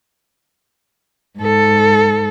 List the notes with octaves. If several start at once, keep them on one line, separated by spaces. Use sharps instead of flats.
G#2 A4